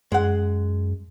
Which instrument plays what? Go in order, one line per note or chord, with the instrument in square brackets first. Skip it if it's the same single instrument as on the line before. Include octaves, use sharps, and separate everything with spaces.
[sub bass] F#2 [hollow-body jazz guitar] G#3 F#5